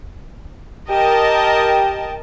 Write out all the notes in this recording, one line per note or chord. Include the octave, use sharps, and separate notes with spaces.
G4 A#4 D#5 G5 A5